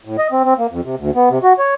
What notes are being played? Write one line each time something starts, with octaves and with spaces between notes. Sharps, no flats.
A2
D#5
C4
C4
A#3
F2
C3
D2
B3
C3
F#4
C#5